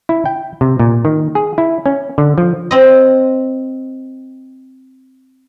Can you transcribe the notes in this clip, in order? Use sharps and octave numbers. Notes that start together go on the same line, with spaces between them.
E4
G5
C3
A#2
D#3
G#4
E4
C#4
D3
F3
C4 D#5